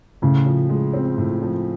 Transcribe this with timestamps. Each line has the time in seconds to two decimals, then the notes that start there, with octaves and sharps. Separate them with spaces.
0.22 A2 C#3
0.46 F3
0.69 G#3
0.94 C4
1.18 A2
1.42 F3